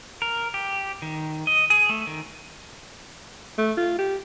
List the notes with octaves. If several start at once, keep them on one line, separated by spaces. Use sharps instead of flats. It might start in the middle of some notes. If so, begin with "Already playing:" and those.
A#4
G4
D#3
D#5
G#4
A3
D#3
A3
F4
G4